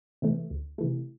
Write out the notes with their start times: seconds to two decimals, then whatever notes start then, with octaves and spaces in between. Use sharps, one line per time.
0.22 C3 E3 A3
0.50 D2
0.78 C3 E3 A3